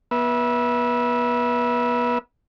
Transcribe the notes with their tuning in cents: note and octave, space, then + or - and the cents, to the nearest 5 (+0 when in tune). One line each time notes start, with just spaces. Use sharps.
B3 -30 E5 +0